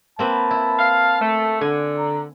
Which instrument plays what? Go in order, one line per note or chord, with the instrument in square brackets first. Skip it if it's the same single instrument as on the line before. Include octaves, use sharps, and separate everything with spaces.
[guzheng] A#3 C4 B4 [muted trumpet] A5
[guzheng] E4
[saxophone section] F5
A3
[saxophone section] D3 [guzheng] G#5
[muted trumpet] A#5